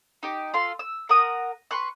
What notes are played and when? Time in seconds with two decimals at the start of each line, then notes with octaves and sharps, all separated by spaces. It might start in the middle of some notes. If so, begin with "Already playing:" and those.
0.23 D#4 G4
0.54 F4 A4 C6
0.79 E6
1.09 A#4 F#5 D#6
1.71 B4 C6 C#6 F#6